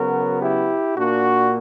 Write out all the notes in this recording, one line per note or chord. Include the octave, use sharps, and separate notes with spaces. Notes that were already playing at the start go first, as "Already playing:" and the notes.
Already playing: C#3 F#3 B3 F#4 A#4
E4 G4
A#2 A#3 D4 F#4